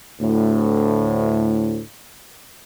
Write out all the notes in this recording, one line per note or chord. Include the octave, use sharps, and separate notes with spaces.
D2 A2